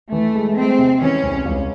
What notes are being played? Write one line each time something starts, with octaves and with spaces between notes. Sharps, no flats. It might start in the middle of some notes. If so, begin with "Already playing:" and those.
E3 A3
G#3
G#3 C4
C3
E3 C#4
C2
C#2